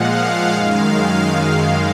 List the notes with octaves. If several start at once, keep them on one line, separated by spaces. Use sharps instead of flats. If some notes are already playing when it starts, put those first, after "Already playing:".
Already playing: A#2 F3 G#3 F5 F#5
F#2 D#3 G#3